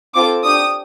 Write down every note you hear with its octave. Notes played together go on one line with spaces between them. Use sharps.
C4 F4 A4 D6
D4 G4 D#6